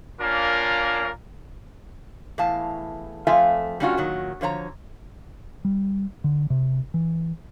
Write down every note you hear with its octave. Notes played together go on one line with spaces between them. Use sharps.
A#3 C#4 D4 F4 A#4
E2 A2 F5 A5
F2 A3 F4 E5 F5 G#5
G3 A#3 C#4 D4 F4 F#4
A#2 D#3 F#3
D3 F3 C#5 A#5
G3
D3
C3
E3